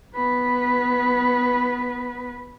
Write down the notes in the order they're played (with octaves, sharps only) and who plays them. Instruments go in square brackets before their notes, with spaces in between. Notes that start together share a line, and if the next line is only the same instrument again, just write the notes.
[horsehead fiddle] B3 B4